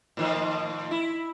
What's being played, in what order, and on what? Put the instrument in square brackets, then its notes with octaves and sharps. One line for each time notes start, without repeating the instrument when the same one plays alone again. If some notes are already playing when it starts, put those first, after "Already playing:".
[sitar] A2 D#3 F3
E4